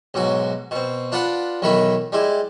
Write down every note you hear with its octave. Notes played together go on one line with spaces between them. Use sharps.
B1 G#2 F#3 F#4
B2 C4
D4 F4 B4 D5 F#5
B1 B2 D#3 E3 B5 C#6
G3 G#3 E4